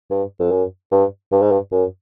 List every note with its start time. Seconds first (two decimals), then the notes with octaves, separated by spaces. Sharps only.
0.10 G2
0.39 F2
0.51 F#2
0.92 G2
1.32 G2
1.42 G#2
1.51 G2
1.72 F#2